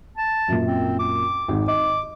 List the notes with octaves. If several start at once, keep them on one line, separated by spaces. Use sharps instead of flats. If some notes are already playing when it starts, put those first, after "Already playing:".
A5
F#2 A#2
C4
D6
G#1
D#5 D6